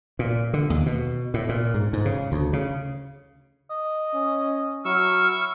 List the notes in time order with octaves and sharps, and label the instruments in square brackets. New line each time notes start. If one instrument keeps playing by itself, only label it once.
[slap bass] A#2
D3
D#2
B2
A2
A#2
G#2
G#2
C#3
D2
C#3
[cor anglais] D#5
[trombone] C#4
[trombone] F#3 [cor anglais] E4 [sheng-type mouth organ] C#6 E6 [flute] F6